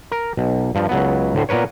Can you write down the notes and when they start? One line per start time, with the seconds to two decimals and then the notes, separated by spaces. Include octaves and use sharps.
0.12 A#4
0.37 B1
0.75 G2 F3
0.89 C#2 F#3 B3
1.35 D2 A2 C5
1.49 A#2 B3 A#4 B4 C#5